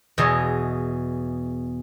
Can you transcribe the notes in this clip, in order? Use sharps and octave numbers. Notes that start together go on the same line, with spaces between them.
E2 B2 G#4 D#5